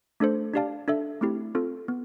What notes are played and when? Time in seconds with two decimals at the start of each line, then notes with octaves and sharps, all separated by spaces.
0.20 A3 D4 A4 C5
0.54 D4 G4 D5 F5 A5
0.88 D4 A4 E5
1.21 A3 C4 E4 G4
1.55 C4 F4 A4
1.88 B3